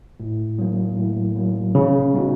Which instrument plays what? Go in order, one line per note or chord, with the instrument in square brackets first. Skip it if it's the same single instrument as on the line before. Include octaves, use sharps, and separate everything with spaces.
[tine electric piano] A2
F#3 A#3
A2
F#3 A#3
[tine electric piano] A#2 [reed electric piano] C#3
[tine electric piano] G3 B3 D#4 F#4